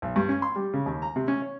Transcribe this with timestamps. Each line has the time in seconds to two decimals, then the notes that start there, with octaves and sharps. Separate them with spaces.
0.02 B1
0.16 G2
0.29 C#4
0.42 C6
0.55 G3
0.73 C#3
0.86 D#2
1.02 A#5
1.16 C3
1.28 C#4
1.42 C#5